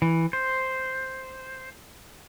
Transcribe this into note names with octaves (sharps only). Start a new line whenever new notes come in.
E3
C5